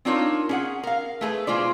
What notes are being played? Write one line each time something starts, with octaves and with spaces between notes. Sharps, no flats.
C4 D4 D#4 F4 A#4 C#5
C#4 G#4 F#5
A#4 F5
A3 G#4 B4
B2 G#3 F4 C5 D5